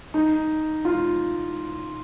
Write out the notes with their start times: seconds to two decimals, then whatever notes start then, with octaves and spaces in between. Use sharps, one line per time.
0.14 D#4
0.85 F4